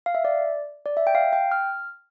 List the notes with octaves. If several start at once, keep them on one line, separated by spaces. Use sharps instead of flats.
F5
E5
D5
D5
E5
G5
F5
G5
F6